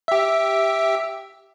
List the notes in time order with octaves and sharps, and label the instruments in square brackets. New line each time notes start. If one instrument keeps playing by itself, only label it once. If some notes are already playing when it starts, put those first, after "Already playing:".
[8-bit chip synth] G4 E5